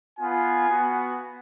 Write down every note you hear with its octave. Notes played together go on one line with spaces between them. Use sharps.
B3 F4 G#5
B3 F#4